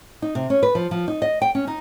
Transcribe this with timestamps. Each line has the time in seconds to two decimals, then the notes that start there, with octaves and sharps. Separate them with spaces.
0.22 D#4
0.35 C3
0.50 C#4
0.63 B4
0.75 F3
0.91 F3
1.08 D#4
1.22 D#5
1.42 G5
1.55 C#4
1.67 D#4